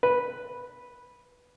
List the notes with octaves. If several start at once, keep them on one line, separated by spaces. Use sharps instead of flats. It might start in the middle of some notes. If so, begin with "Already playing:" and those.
B4